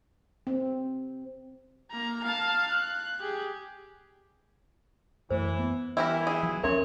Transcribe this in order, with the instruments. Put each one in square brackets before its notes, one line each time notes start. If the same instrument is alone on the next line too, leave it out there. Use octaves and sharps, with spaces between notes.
[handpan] C4
[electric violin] A#3 A#5
F5 A5
F#6
G4 G#4
[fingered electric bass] F#2 A3 [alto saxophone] E3 [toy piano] C5
[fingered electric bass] B3
[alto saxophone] E3 [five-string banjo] E4 G4 A#4
[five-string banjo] G#4
[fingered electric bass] F3 F#3
[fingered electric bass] D#2 C#4 [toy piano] A#4 E5 C6 [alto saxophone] C#5